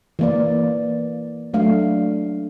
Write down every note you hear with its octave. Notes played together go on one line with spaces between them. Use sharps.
E3 A#3 D5
F#3 A3 D4 F5